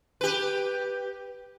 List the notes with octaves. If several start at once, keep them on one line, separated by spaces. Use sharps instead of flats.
G4 B4